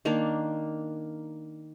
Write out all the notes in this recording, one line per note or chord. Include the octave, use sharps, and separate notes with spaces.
D#3 A#3 D4